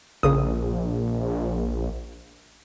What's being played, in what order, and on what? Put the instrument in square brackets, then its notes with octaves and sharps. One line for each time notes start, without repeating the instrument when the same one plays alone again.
[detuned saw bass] A#1 [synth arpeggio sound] C#3 D#6